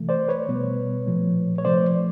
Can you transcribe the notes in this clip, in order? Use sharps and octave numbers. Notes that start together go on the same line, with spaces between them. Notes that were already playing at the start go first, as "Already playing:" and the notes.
Already playing: C3 E3 A3
C5 D5
B4 C#5
B2 G3 B3
A#2 F3 A3
C#5
C3 F3 A3 C5 D5